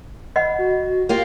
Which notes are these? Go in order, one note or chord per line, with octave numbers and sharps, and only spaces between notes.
D#5 F#5 B5
F#4
A#3 F4 G4 F5